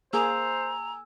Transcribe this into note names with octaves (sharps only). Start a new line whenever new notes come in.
A#3 G#4 C5 G#5 A#5 E6